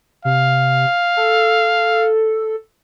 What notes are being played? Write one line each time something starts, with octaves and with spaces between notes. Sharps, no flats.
C3 F5
A4